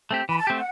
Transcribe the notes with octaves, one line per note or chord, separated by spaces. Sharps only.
A3 C4 G4
E3 B5
A5
A3 C4 G4
F#5